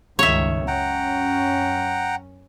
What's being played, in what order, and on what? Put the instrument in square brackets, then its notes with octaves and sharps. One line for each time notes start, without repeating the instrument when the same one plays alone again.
[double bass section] C#2 G2 D#3 [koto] C#5 E5
[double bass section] F#2 C#4 [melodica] F#5 G5 A#5